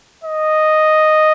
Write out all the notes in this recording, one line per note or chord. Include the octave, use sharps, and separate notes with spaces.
D#5